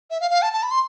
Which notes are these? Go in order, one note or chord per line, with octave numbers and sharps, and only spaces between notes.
E5
F5
F5
A5
A5
B5
C6